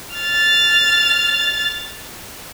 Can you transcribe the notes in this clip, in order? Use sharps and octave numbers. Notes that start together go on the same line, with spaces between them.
F6 A6